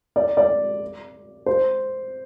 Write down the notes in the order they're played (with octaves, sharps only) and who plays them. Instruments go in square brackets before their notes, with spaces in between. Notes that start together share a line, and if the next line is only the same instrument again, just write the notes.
[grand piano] D5
D5
C5